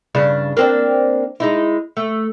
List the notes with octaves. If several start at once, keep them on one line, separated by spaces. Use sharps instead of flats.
G2 C#3 D4
A#3 C4 D4
G#3 D#4 E4
A3